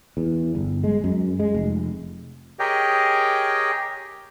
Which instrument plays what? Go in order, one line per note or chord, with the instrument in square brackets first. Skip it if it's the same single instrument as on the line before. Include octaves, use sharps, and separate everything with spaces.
[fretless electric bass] E2
G1
G#3
F#2
G#3
F1
[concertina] G4 G#4 A#4 C#5 D#5 G5